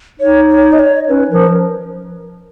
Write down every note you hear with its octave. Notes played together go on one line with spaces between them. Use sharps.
D#4 C#5
C#5
D#5
C#5
C#4 B4
F3 A#4